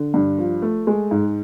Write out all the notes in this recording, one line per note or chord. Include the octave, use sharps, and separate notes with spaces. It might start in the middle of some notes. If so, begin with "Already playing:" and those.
Already playing: D3
G2
F3
A3
G#3
G#2